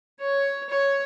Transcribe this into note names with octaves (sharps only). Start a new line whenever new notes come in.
C#5
C#5